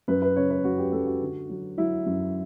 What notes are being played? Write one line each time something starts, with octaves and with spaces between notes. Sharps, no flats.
F#2 B4
B4
C#3 C#5
B4
F#2 F#4
G4
F#2 A4
F#4
D3
F#3
F#3 E4
F#2